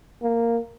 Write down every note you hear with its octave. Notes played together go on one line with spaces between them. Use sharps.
A#3